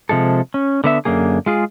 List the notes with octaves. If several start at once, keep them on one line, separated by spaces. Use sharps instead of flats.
C3 F3 G#3 A4
C#4
D3 B3 E5
F#2 D3 A#3 G#4
G#3 F4 G#4